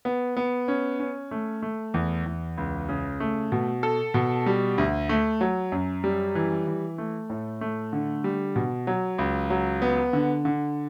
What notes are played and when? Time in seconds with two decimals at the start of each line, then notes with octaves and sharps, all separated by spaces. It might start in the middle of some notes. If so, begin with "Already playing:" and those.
0.05 B3
0.37 B3
0.68 C#4
1.00 C#4
1.31 A3
1.62 A3
1.94 E2
2.26 E2
2.57 C#2
2.89 C#3
3.20 A3
3.52 B2
3.83 A4
4.14 B2
4.46 G3
4.78 D2
5.09 A3
5.41 F#3
5.72 F#2
6.04 G3
6.35 E3
6.67 E3
6.98 A3
7.30 A2
7.61 A3
7.93 D3
8.24 G3
8.56 B2
8.87 F#3
9.18 C#2
9.50 F#3
9.82 B3
10.13 D3
10.45 D3